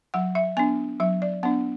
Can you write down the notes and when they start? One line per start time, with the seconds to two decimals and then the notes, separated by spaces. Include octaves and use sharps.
0.14 F#3 F#5
0.35 E5
0.57 B3 D4 G#5
1.00 F#3 E5
1.22 D5
1.43 B3 D4 F#5